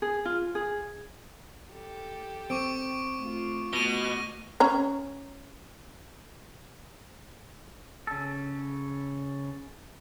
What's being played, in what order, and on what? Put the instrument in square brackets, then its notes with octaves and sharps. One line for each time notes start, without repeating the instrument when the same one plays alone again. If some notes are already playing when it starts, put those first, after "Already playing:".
[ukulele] G#4
F4
G#4
[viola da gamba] G4 A4
[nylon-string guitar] C4 [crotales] C#6 D6 D7
[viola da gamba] A3 F4
[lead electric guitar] B2 [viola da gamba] A3 [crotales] A#6 D#7
[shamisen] C#4 C#5 A#5
[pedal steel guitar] C#3 A4